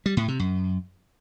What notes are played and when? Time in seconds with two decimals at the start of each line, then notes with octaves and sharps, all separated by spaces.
0.06 G3
0.17 A2
0.28 C3
0.39 F#2